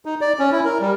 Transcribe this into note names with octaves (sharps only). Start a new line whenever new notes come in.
D#4
D5
C#4
E4
A#4
G3